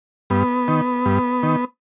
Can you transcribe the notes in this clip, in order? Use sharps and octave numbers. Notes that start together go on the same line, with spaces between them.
G2 B3
D#3
G2
D#3